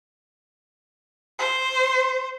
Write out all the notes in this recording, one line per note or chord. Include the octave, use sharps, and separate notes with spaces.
C5